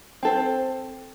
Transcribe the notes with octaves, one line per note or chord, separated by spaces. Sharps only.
C4 A4 C5